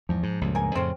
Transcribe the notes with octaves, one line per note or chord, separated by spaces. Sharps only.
E2 G#2 F3
G#2
C#2 G2 A#2
A#4 G#5
F2 A2 C#3 C4 C#4